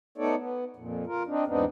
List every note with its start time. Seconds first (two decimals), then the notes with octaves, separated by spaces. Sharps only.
0.18 A3 B3 D#4 A4 C#5 D5
0.37 B3
0.76 F2 A#2
1.07 F4 A#4
1.27 C4 D4 D#4
1.47 E2 G#2 B3 C4 D4 D#4